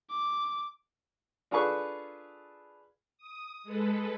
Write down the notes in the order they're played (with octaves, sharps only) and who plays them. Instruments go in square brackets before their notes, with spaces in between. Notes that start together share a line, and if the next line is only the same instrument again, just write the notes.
[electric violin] D6
[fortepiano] D4 F4 G#4 A4 B4 C#6
[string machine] D#6
G#3 A4 B4